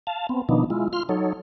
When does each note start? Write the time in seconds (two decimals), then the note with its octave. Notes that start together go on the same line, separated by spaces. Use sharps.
0.07 F5 A5
0.29 B3 C4
0.49 B2 D#3 F3 B3 D4 D#4
0.70 G#3 E4 F4
0.93 F4 C6 F6
1.09 F#3 D#4 A4 C#5